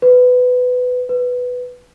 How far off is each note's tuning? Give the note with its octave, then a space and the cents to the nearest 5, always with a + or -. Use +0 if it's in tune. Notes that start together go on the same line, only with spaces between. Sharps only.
B4 +15
B4 +5